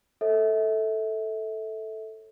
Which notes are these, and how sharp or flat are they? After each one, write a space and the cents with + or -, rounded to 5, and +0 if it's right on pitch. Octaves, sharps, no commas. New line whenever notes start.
A4 +0 C#5 -45 E5 -30